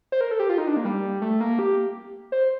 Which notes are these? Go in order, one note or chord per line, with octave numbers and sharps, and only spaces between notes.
C5
A#4
A4
G4
F4
D#4
D4
A#3
G3
A3
A#3
G4
C5